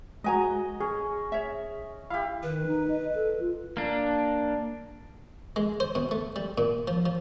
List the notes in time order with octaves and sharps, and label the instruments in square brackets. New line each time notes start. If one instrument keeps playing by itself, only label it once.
[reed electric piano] G#3 F#4 [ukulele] B4 G#5 A#5 [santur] D#5
[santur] C#4 [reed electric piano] G#4
[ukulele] C#5 E5
[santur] E4 G4 [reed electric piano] F5
[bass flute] D#3 [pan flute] B4
[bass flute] D#4
D#5
A4
F4
[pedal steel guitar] A#3 D4
[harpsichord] G#3
C5
B2
A3
G3
A#2
F3
F3